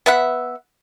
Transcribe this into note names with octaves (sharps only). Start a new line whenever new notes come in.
B3 E5 F#5